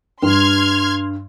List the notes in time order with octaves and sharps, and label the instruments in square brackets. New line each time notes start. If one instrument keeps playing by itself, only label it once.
[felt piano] G2 [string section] C6 F6 G#6